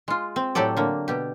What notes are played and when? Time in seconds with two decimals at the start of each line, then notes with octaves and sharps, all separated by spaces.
0.08 G#3 F4
0.36 C4
0.55 A2 F#3 G4 A4 D5
0.77 D3 A#3
1.08 B2 G4